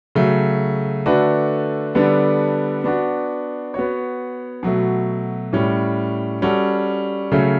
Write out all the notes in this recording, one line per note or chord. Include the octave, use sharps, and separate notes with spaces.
C#3 F#3 A3
D3 A3 D4 F#4 B4
D3 G3 B3 D4 A4
B3 D4 F#4
B3 F#4 C#5
B2 F#3 A3
A2 G3 C#4
G3 C#4 F#4 A4
C#3 F#3 A3 C#4